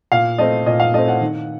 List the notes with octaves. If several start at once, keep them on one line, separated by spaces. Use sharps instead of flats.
A#2 F5
A3 C4 D#5
A#2 D#5
F5
A3 C4 D#5
F#5
D#3